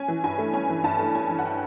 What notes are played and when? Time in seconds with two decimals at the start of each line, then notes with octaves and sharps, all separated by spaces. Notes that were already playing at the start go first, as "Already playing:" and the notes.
Already playing: C#4 G#5
0.08 E3
0.24 G2 G#5
0.38 A3
0.53 C#4 G#5
0.70 E3
0.84 G2 A5
0.99 A3
1.14 C#4 G#5
1.30 E3
1.39 F#5
1.45 G5